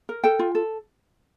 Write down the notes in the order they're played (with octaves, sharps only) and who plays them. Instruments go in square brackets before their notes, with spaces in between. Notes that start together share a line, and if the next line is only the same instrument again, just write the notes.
[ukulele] A#4
A4 G5
F4
A4